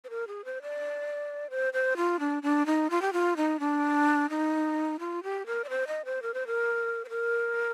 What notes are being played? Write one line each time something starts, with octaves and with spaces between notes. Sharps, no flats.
C5
A#4
G#4
C5
D5
C5
C5
F4
D4
D4
D#4
F4
G4
F4
D#4
D4
D#4
F4
G4
A#4
D5
C5
D#5
C5
A#4
C5
A#4
C5
A#4